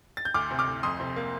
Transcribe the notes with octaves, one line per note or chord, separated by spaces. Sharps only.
A6
G6
D2 D6 F6
C3
D6 F6
D2
F2 C6 D#6
C3
A#3